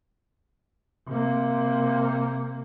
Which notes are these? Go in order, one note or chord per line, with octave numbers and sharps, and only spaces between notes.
C3 A#3